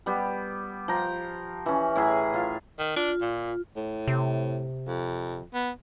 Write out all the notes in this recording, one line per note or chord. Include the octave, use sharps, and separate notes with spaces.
G3 B3 G4
F3 G5 A#5
E3 C#4
A2 E4 G#4 A#5
F4 F5
D#3
D4 F4
A#2
A2
C3
F2
B3